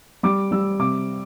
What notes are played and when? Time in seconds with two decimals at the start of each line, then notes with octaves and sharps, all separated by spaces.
0.23 G3 D6
0.51 G3 E6
0.79 C3 D6